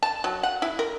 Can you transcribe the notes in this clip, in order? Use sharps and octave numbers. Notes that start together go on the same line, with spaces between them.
A5
F#3
F#5
E4
A#4